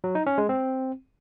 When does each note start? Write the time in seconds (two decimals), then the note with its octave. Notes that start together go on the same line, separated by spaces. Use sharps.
0.04 F#3
0.15 D#4
0.26 C#4
0.38 G#3
0.49 C4